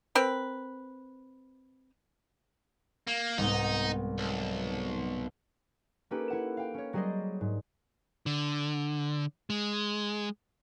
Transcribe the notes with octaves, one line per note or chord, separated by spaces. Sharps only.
C4 A#4 B4
A#3
C2 G#2 B3 D#4
B1
A#3 C#4 D#4 G4 A4 B4
E4 F#5 E7
F5 G5
C#4 C#5
F#3 G3 G#4 C5 D5 D#5
G#2
D3
G#3